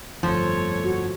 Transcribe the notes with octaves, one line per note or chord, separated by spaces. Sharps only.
G1 F2 F3 A3 C#5
F#4